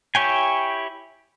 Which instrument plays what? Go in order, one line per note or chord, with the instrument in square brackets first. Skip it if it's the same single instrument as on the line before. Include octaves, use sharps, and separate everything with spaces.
[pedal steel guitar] E4 G4 C#5 G5 G#5